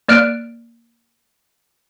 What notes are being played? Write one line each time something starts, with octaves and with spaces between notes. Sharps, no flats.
A#3 D5 F6 F#6 D7